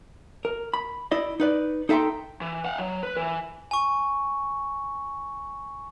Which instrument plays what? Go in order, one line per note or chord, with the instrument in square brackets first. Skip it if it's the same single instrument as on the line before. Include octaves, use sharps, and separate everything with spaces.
[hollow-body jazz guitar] A#4
B5
E4 D5 D#5
D#4 B4 D5
D#4 A4 E5 G5 A#5 C6
[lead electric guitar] E3
F5 F#5
F#3
B4
E3
[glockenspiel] G#5 C#6